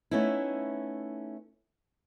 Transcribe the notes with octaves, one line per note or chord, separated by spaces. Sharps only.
A3 B3 C#4 D#4 E4